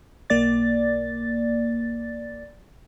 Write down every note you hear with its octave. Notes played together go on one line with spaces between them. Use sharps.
B1 A#3 D5 A6